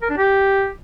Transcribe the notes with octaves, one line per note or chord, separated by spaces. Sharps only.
A#4
D4
G4